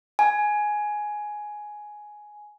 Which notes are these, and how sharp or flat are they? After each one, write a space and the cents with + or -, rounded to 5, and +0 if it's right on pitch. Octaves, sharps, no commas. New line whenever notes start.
G#5 +10